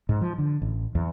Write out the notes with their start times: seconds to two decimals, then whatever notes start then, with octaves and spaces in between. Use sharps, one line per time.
0.09 G#2
0.21 F3
0.38 D3
0.62 A1
0.95 E2